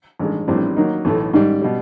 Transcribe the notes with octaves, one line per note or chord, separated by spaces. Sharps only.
A1 G2 D#3 G#3
A#1 A2 E3 G3 C4
D#3 F#3 A#3 D#4
B1 A2 E3 A3
G#2 D#3 G3
B2 G3